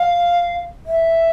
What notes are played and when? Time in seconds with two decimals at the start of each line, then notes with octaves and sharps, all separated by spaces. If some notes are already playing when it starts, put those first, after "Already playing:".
Already playing: F5
0.86 E5